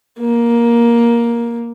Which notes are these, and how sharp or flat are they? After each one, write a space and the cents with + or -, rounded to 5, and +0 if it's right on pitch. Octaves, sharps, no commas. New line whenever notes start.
A#3 +10